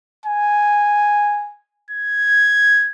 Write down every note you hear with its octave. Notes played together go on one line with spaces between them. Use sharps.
G#5
G#6